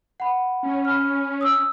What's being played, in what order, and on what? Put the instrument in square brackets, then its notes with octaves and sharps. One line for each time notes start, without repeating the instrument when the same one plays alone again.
[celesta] F#5 B5
[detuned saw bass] C#4
[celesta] B5 F6
D#6 E6